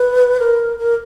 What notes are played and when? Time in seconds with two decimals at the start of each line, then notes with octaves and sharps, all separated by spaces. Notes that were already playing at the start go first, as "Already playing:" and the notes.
Already playing: B4
0.40 A#4
0.79 A#4